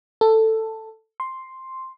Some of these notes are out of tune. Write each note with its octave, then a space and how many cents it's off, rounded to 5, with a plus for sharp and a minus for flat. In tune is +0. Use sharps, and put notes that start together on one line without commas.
A4 +10
C6 +5